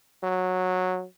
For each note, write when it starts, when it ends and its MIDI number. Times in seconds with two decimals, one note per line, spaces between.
0.23 1.05 54